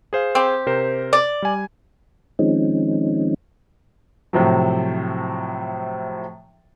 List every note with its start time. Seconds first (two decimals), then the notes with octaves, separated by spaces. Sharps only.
0.13 G#4 C5 F5
0.35 C4 G4
0.66 C3 A#4 C5
1.13 D5
1.42 G3 G#5
2.39 D#3 F3 G#3 C4 C#4 D#4
4.33 A2 C3 F3 F#3